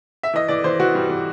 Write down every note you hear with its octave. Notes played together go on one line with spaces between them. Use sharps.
E5
E3 D#5
E3 D5
E3 C5
E3 F#4
G3
E3